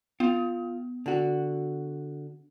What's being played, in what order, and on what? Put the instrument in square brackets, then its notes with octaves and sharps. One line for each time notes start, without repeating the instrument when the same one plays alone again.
[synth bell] B3 [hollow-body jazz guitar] F4
[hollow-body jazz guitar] D3 F#4